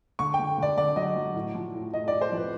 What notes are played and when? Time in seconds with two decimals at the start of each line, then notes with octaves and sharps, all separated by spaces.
0.19 D3 C#6
0.34 G5
0.39 D3
0.58 D3 D5
0.77 D3 D5
0.96 F#3 D#5
1.16 F#3
1.35 A2
1.54 F3
1.74 A2
1.93 A2 D#5
2.08 A2 D5
2.21 C5
2.32 F3 B4